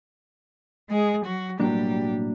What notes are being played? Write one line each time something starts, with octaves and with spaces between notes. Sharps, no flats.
G#3 G#4
F#3 F#4
B1 A2 F#3 G3 A#3 D4 G4